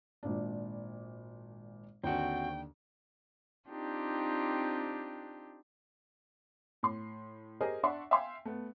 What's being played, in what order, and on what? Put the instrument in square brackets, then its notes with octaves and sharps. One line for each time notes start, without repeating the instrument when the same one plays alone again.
[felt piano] G#1 A#2 D4
[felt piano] D#2 D3 [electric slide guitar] C4 F#4 [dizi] G5
[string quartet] C4 D4 D#4 F4 G4
[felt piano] A2 C6
G4 G#4 A#4 C5 D#5 G#5
D4 D5 E5 F#5 C6 C#6
E5 F5 G5 G#5 C6
A3 B3